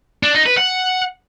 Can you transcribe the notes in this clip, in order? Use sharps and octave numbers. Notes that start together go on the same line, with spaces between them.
D4
D#4
B4
F#5